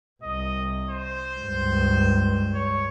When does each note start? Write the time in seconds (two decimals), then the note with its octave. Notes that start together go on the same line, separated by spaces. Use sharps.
0.23 C2 D#5
0.89 C5
1.38 C#2 G2
2.54 C#5